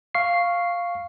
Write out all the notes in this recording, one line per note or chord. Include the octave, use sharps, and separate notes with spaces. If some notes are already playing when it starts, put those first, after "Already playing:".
F5 C#6 C7